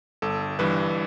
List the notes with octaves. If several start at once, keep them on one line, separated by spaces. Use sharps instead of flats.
G1 A4
G2 E3 B4